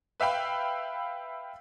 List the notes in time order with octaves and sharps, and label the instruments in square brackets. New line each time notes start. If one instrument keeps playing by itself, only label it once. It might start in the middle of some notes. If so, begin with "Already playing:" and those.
[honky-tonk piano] B4 E5 F5 G5 B5